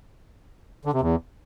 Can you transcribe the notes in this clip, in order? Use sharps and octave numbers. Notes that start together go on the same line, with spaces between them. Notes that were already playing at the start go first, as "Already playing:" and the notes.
D3
C3
E2